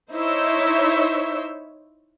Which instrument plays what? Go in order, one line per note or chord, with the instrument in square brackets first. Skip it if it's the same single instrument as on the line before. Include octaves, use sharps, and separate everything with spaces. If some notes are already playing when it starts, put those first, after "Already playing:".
[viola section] D#4 E4 C5 C#5 E5